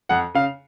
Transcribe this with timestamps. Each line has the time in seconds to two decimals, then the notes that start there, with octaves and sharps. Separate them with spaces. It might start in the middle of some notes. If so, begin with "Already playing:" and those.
0.09 F2 F#5
0.35 C#3 F5